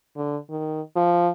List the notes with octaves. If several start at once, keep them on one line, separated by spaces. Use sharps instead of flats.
D3
D#3
F3